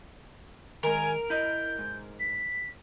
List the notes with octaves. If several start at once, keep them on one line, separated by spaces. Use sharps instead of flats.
D#3 G#3 A#4 G#5
E4 D#5 G6
G#2
B6